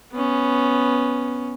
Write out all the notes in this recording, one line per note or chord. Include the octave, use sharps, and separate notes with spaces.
B3 C#4